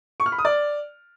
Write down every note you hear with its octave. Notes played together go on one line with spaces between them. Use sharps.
C#6
F6
B5
D#6
D5